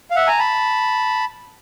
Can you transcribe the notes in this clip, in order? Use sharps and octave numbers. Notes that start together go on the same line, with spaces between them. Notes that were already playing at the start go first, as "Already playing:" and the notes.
F5
E5 F#5
G#5 A#5
A5 B5